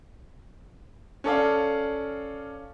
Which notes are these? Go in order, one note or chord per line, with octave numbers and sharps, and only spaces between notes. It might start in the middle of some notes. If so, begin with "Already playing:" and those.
C#4 A4 D5 F5